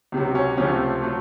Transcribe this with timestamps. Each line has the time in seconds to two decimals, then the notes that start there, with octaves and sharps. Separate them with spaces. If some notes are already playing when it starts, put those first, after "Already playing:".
0.12 C#2 C3 F#3
0.35 C#4
0.57 C#2 C3 F3 A3 C#4
1.02 F#3 A3